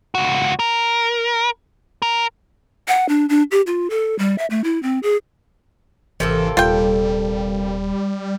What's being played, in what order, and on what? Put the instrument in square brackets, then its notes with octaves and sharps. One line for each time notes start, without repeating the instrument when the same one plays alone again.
[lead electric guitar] C#2 F#4
A#4
A#4
[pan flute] F#5
D4
D4
G4
F4
A4
G3
E5
A3
E4
C4
G#4
[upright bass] G#1 [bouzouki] C3 A#3 A4 [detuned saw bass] E3
[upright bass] D#1 [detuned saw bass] G3 [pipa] F4 G5